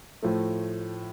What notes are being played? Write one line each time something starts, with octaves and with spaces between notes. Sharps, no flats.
A2 F3 A3